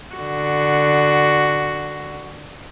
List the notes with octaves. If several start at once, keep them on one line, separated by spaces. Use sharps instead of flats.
D3 F#4